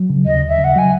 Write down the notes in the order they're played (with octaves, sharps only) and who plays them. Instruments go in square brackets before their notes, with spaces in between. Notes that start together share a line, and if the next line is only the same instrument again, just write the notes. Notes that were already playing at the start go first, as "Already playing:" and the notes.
Already playing: [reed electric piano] F#3
C#3
[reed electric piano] D#2 [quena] D#5
[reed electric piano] D#2
[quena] E5
[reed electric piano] C#3
[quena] F#5
[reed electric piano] F#3 [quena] G#5